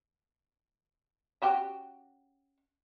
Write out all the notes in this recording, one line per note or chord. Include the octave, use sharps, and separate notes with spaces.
C#4 F#4 G4